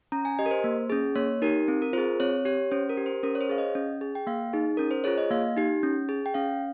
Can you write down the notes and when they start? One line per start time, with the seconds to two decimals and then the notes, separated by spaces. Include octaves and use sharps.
0.12 C#4 A#5
0.25 G#5
0.39 G4 D#5
0.46 A#4
0.51 C5
0.64 A#3
0.90 C#4 G#4
1.16 A#3 C#5
1.42 D#4 G4 A#4
1.68 C4
1.82 A#4
1.93 F4 C5
1.98 G#4
2.20 C4 C#5
2.45 G4 C#5
2.71 C#4 C5
2.89 A#4
2.97 G4
3.06 C5
3.23 C#4 A#4
3.35 C#5
3.41 C5
3.49 G#4 F5
3.58 D#5
3.75 C#4
4.01 G#4
4.15 G5
4.27 A#3 F5
4.53 D#4 G#4
4.77 C#4 A#4
4.91 C5
5.04 F4 G#4 C#5
5.18 D#5
5.31 A#3 F5
5.56 D#4 G4
5.83 C#4
6.09 G#4
6.26 G5
6.34 C#4 F5